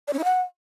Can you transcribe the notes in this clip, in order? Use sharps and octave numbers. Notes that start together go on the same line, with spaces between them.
D5
C#4
E4
F#5